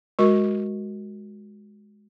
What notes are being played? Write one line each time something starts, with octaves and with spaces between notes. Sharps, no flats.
G#3 F#4 A#4 C#6